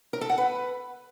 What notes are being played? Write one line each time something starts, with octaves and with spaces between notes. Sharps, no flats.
A#4
A4
F#5
B4